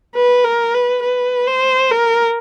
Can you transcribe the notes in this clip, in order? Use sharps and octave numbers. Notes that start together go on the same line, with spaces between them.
B4
A#4
B4
B4
C5
A#4